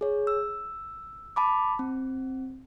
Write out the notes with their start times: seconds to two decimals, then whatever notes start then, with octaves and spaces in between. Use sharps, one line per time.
0.01 G#4 C#5
0.27 E6
1.36 A5 B5 D6
1.79 C4